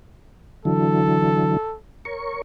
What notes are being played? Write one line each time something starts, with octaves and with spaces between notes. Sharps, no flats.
D3 E3 F#3 A4
A#4 C#5 C#6